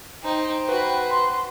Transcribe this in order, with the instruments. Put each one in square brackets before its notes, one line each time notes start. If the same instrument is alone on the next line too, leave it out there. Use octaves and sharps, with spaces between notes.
[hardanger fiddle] D#4 [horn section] C5 G5
[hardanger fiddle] F#4 [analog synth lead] B4
[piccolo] C6